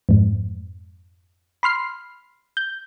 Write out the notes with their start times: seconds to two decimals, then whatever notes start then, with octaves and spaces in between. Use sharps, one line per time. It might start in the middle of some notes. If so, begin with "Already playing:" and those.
0.09 F2 G#2
1.63 B5 C6 F6 C7
2.57 G6